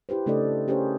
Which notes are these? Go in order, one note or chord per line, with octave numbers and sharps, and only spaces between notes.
E4 G4 B4 C5
C#3 A3 D4 A4 D5 D#5
C#4 G4 G#4 A#4 C5 C#5